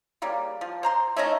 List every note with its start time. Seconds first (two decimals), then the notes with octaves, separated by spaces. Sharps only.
0.22 C#3 G3 A#3
0.61 F3
0.83 C5 A#5 C6
1.16 A3 C#4 D#4 D#5